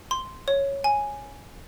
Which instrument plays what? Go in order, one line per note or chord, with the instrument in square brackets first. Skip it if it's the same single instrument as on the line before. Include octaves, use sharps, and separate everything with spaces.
[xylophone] C6
C#5
G#5